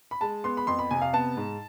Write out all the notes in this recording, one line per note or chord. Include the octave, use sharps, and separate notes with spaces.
B5
G#3 A5
B3 C6
B5
F2 C6
B5
C3 G#5
F5
B3 A5
G#2